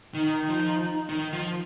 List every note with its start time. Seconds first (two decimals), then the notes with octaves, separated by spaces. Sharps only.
0.14 D#3 D#4
0.50 F3
1.09 D#3
1.33 F3